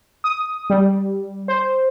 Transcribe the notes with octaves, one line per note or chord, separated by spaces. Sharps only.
D#6
G3
C5